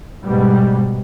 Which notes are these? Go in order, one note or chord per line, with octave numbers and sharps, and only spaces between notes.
G#2 B2 G3